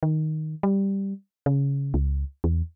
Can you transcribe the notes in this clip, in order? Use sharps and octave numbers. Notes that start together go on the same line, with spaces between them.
D#3
G3
C#3
C#2
E2